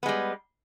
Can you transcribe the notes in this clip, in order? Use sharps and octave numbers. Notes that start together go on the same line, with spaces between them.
G3 G#3 B3